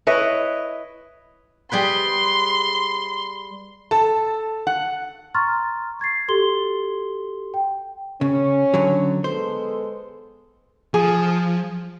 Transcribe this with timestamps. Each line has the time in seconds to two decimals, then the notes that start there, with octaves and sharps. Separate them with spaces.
0.07 E4 B4 C#5 D#5
1.72 G3 G#4 B4 C6
3.91 A4 A5
4.67 F#5
5.34 A#5 C6 C#6 F6 A6
6.00 C#6 G#6 A6 C7
6.28 F#4 G4 A4 C6 G7
7.54 G5
8.21 C#3 C#4
8.74 D3 F#3
9.24 G#3 B3 A4 C5
10.94 F3 G#4